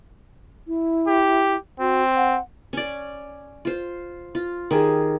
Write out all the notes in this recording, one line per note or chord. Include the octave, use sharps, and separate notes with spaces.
E4
G4
C4 F#4
F#5
C#4 D5
F4 C5
F4
D#3 G4 G#4